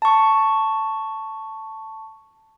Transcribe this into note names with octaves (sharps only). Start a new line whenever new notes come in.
A5 C#6